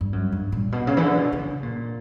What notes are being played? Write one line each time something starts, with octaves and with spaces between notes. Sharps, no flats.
G2
F#2
G2
A#2
B2
C#3
E3
D3
B2
C#3
A#2